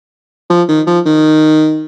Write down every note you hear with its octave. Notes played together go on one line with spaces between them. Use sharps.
F3
D#3
F3
D#3